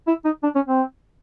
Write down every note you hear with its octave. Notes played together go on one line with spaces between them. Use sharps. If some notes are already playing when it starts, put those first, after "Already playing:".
E4
D#4
D4
C#4
C4